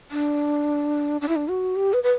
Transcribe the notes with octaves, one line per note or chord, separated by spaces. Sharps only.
D4
D4
E4
D4
F#4
G4
B4
B4